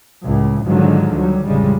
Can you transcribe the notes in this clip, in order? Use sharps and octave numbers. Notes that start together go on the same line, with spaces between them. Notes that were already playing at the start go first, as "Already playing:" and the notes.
C#2 A2
G#2 D3 D#3 F3 F#3 G#3
D2 F#3 G3
A1 F2 C#3 G3 G#3